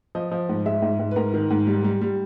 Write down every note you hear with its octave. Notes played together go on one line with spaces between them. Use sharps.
F3 D#5
F3
G#2
G#3 E5
G#2
G#2
B4
G#2 A#4
D#3
G#2
G3
G3
G3